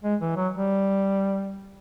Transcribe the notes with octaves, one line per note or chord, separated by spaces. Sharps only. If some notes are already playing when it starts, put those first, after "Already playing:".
G#3
E3
F#3
G3